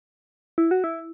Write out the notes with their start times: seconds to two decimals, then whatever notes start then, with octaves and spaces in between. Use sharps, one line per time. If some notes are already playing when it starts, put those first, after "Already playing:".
0.58 E4
0.71 F#4
0.84 E4